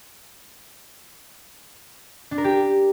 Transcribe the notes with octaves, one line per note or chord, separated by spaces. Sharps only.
D4
A#4
G4